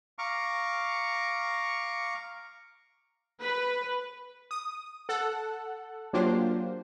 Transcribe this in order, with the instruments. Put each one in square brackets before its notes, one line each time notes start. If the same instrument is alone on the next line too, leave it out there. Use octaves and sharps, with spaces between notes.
[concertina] F5 A#5 C#6 D6
[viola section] B4
[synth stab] D#6
A4 F#5
F#3 A#3 D4 F4 G4 C5